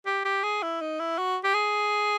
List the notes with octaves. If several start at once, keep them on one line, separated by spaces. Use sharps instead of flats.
G4
G4
G#4
E4
D#4
E4
F#4
G4
G#4